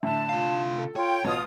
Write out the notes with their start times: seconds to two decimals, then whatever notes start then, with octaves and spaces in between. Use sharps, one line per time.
0.03 A2 D3 E5 A5
0.29 C3 F4 F5
0.78 A4
0.96 F4 C#5 G5
1.25 A1 B2 F4 A5 D#6 F6